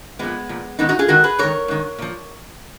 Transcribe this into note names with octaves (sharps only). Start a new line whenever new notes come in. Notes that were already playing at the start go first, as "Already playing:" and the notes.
A#2 F3 G#3 B3
A#2 F3
G#2 D#3 B3 D#4
D#4 F#4
F4 G#4
G#2 D#3 F#4 A#4
G#4 B4
G#2 D#3 A#4 C#5
G#2 D#3
A#2 F3